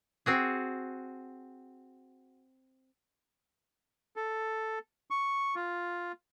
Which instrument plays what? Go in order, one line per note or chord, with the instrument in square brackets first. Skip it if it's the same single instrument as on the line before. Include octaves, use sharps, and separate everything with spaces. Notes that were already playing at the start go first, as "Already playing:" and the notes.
[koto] C4 F#4 G#4
[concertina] A4
C#6
F4